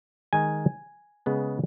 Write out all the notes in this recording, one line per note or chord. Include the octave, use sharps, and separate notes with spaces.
D#3 G#3 D#4 G#5
C#3 G#3 B3